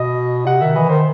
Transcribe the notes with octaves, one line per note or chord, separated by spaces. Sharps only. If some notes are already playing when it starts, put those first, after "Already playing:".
Already playing: B2 D#5
C3 F#5
D#3 E5
E3 D#5
D#3 C5